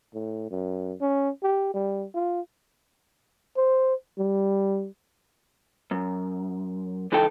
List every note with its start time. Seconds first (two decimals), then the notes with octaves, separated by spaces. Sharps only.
0.14 A2
0.51 F#2
1.01 C#4
1.43 G4
1.74 G3
2.14 F4
3.57 C5
4.19 G3
5.91 F#2
7.12 C#2 E3 D#4 A4 G5